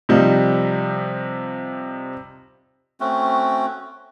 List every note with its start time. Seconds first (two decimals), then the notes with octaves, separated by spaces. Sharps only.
0.09 C3 F3 G3 D#4
3.00 A3 C4 C#4 F#4